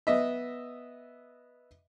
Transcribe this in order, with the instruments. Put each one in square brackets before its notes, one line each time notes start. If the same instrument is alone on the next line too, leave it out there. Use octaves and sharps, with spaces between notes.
[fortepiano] B3 D#5 E5